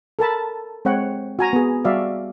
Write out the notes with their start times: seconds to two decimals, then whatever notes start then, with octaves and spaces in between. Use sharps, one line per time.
0.19 A4 A#4 A5 B5
0.85 G#3 C4 C#5 F#5 G5
1.39 F#4 G#5 A#5
1.53 B3 G#4
1.85 G3 F#4 D5 E5 F5